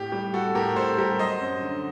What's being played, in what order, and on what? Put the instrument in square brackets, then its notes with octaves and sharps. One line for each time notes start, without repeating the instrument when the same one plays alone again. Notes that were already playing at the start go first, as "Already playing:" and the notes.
Already playing: [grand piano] A2 G4
G3 G4
G3 F#4 A4
A2 G4 A#4
A2 A4 C5
G3 G4 A#4
F#3 C5 D#5
F#2
D3